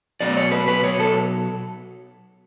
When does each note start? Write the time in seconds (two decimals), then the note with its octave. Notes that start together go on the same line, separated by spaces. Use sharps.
0.20 B2 F#3 B3 D5
0.37 C#5
0.52 B4
0.68 B4
0.84 C#5
1.00 A4